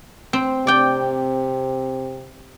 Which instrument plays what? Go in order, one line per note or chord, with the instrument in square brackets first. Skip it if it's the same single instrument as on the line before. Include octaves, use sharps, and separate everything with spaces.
[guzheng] C4
[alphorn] C3 [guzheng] D5 G5